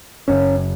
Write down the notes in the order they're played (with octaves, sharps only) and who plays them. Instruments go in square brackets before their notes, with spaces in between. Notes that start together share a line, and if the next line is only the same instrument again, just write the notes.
[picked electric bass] F#1 F#2 C#3 C#4